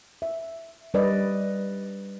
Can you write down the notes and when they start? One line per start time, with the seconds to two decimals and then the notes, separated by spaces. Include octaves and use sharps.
0.22 E5
0.94 G3 B4 D5 D#5